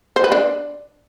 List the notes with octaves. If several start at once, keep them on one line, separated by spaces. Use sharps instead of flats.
C5
B4
D4